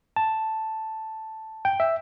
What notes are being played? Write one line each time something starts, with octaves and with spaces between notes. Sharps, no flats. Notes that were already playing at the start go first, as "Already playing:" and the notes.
A5
G5
E5